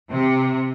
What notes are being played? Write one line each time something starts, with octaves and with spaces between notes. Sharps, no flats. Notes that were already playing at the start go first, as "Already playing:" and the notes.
C3